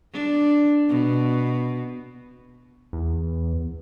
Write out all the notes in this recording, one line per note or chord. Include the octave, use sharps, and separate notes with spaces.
D4
B2
E2